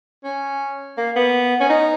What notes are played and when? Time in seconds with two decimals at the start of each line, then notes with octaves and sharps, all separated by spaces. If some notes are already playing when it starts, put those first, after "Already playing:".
0.24 C#4
0.98 A#3
1.16 B3
1.61 C#4
1.70 D#4